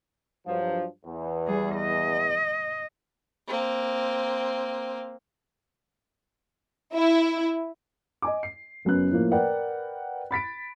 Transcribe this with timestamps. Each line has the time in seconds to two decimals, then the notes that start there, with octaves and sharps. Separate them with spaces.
0.47 G2 F3 F#3
1.05 E2
1.47 G3 G#4
1.76 D#5
3.48 A#3 C4
6.95 E4
8.22 D#5 G#5 D6
8.43 C7
8.85 F#1 F#2 B3 F#6
9.11 A2 F3 A#3
9.32 A#4 B4 D5 F#5 G5
10.31 B5 A6 B6 D7